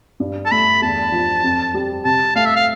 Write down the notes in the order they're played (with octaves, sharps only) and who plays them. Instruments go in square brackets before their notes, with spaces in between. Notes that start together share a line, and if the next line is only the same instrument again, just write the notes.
[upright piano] G2
[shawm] A5
[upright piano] A3 [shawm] B5
[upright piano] E2 [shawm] A5
[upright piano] F3
F2
G3
[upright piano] C3 [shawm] A5
[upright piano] A3 [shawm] F5
[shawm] E5
F5